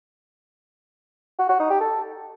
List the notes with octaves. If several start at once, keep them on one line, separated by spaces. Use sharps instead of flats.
F#4
F#4
D#4
G4
A4